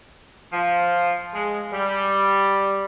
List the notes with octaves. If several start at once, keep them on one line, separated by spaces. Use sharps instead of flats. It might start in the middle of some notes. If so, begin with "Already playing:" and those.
F3
G#3
G3